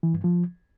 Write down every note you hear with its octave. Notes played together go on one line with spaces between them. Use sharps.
E3
G2
F3